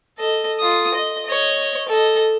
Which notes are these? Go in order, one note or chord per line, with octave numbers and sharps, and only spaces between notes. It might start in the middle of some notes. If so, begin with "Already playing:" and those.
A4 D#5
F4 D#6
D#5
C#5 D#5
A4 D#5